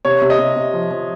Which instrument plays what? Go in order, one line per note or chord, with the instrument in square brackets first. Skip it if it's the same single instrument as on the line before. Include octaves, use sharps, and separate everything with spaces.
[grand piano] C3 C#5
C3
D#5
C3
C3
F3
F3